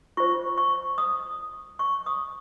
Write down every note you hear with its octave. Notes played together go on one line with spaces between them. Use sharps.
F4 C5 C#6
C#6
D#6
C#6
D#6